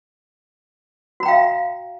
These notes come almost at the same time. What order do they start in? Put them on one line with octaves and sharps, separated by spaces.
F#4 A#5 G5 F5 E5